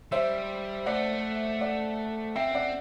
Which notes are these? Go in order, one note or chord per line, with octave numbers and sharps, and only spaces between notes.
G3 C5 E5
A3 D5 F#5
D5 F#5
C4 E5 G5
D5 F#5